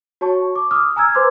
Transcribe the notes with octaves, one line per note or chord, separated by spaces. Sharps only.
F#4 C#5 A5 C#6
D6
D6 D#6 F6
G#5 A#5 E6 F6 G#6
B4 C5 C6 D6 G#6